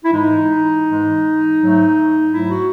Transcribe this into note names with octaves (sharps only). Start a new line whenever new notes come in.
E4
G#2 E3 G#3 D#4
G#2 E3 G#3
G#2 F#3 A3
G#2 F#3 A3 E4
F#4